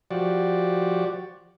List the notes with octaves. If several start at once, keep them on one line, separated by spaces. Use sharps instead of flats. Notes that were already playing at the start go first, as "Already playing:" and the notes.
F3 F#4 G4 D5